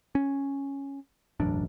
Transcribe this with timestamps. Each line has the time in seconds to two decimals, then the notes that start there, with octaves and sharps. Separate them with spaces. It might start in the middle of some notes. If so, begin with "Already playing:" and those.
0.15 C#4
1.40 E1 A1 F#2 D4